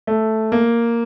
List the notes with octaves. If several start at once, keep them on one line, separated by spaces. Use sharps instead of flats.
A3
A#3